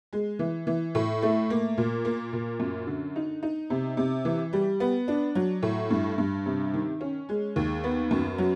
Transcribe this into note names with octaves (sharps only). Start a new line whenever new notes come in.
G#3
E3
E3
A2
A3
A#3
A#2
A#3
A#2
F#2
D3
D#4
D#4
C3
C3
E3
G3
B3
D4
F#3
A2
G2
G2
C3
D#3
C#4
G#3
D#2
B3
F#2
F#3